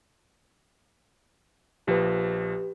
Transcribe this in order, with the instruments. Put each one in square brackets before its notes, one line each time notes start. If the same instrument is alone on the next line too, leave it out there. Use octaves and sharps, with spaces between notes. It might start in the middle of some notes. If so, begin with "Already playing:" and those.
[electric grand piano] A#1 F3 [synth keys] G4 B4